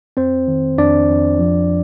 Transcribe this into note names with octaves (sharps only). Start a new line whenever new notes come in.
F2 C4 C5
D#3
F2 D4 D5
F2
F3